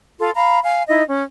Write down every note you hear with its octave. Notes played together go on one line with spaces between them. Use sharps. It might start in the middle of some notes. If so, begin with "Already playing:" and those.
F4 A4 C6
F5 A#5 B5
F5 G#5
D#4 E4 D#5
C#4